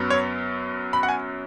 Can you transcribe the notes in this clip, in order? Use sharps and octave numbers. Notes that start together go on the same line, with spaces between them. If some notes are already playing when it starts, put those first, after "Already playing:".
Already playing: F#2 F#3 B3
C#5
B5
F#5
G#5